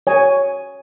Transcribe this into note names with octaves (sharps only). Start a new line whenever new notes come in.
C#5 G#5